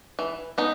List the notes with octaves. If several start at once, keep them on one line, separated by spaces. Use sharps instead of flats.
E3
B3 D#4